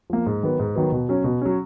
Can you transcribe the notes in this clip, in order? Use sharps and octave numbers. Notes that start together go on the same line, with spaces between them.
F3 A#3
G#2
D#3 F#3 B3
G#2
D#3 F#3 B3
B2
F#3 C#4
B2
F#3 C#4